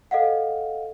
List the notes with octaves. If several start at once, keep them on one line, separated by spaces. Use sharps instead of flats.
A4 D#5 F5 F#5